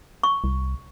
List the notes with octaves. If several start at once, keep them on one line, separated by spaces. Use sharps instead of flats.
C#6
C2